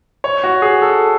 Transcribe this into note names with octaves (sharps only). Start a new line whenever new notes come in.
C#5
F#4
G#4
A4